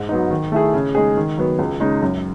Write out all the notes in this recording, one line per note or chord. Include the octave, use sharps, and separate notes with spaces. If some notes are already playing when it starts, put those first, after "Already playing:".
Already playing: G#2
F#3 B3 D#4
D#3
A3 E4 G#4
C#3
G#3 D#4 G#4
D#3
F#3 B3
C#2
C#3 G#3 D#4
F#2